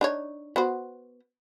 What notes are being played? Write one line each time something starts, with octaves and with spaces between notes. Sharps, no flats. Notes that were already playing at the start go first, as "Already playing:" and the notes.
D4 D#4 C#5
B3 F#4 C5